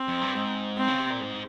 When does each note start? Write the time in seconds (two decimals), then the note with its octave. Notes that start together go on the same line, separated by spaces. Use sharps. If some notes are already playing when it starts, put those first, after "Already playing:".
Already playing: C4
0.08 F2
0.22 G2
0.35 G#2
0.78 C4
0.88 C#3
0.99 C3
1.10 A#2
1.21 G#2